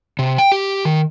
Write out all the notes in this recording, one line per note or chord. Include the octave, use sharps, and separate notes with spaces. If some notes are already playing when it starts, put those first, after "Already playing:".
C3
G5
G4
D#3